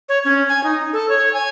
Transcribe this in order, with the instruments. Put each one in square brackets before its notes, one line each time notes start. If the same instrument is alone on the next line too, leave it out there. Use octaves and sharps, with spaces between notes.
[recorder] C#5
C#4
G#5
D#4
A4
C#5
G#5